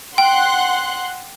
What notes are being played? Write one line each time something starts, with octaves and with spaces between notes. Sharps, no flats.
F#5 G5 C6 F#6